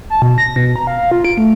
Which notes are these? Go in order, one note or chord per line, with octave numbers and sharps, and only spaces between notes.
A5
B2
A#6
B2
A#5
F5
F4
D7
A3